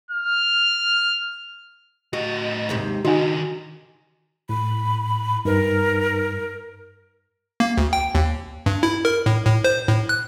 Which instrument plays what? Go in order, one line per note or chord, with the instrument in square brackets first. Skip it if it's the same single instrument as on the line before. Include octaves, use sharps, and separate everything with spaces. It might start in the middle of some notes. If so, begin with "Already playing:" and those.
[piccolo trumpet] F6
[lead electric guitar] A2 D#5 [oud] F#4
[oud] D#2 G#2 C3
[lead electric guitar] D#3 D4 [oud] D#4 [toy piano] F#4 G#5
[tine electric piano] A2 [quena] B5
[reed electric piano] G2 [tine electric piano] D#4 B4 [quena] A#4
[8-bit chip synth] A#3
D2
G5
D#2
G2
E4
A#4
A2
A2
C5
A2
F#6